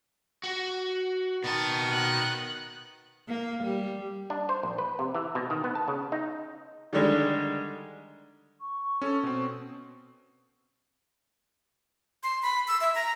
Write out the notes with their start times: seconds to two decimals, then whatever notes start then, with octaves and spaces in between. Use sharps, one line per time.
0.44 F#4
1.44 B2 D#3 B3 A5
1.92 F#6
3.28 A#3
3.64 G3
4.30 D4
4.49 C5
4.63 A#1
4.78 B4
4.99 C3
5.15 E3
5.35 B2
5.50 D#3
5.64 B3
5.75 A5
5.88 C#3
6.12 D#4
6.93 D3 D#3 G3 G#3
8.60 C#6
9.02 C#4 A4
9.23 B2 C4
12.23 C6
12.43 B5
12.68 E6
12.81 E5
12.95 A#5